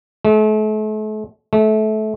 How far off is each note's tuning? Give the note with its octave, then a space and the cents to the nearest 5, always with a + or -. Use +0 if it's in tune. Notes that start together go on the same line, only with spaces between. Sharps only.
A3 -40
A3 -25